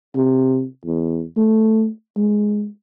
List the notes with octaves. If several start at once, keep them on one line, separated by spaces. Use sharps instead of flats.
C3
E2
A3
G#3